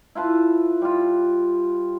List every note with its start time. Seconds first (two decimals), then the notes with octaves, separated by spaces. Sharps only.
0.15 E4 F4 B4 A5
0.82 G3 F4